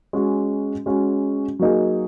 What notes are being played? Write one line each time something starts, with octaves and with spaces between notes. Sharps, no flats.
G#3 C#4 F#4
G#3 C#4 F#4
F#3 A#3 D#4 G#4